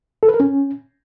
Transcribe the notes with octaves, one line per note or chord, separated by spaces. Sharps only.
A4
B4
A#4
C#4